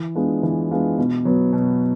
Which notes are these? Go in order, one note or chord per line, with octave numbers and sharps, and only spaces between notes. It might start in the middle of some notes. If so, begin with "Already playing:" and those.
Already playing: E3
G#3 B3 D4 F4
E3
G#3 B3 D4 F4
B2
F#3 B3
B2